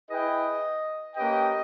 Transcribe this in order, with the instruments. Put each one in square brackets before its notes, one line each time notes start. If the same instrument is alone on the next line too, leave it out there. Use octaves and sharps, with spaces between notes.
[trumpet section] E4 G#4 B4 G5 [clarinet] D#5
[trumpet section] A#3 C#4 G4 B4 G5 [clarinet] D#5